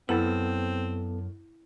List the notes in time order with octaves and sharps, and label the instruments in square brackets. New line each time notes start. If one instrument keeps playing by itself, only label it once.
[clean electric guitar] F#2 [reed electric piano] B3 A4 A5 [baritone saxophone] C4 [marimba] E4